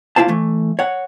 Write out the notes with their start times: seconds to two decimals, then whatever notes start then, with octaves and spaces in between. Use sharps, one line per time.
0.16 A#3 E4 F4 C5 A5
0.28 E3 A3
0.79 C#5 F#5